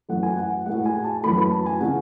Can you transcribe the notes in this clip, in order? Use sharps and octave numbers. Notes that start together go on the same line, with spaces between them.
F#2 E3 A3 F#5
G#5
F#5
A2 G#3 F#5
G#5
A5
F#2 E3 A3 B5
B5
A5
G#5
C#3 E3 F#5